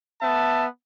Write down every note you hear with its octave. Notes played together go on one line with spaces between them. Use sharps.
B3 E5 A5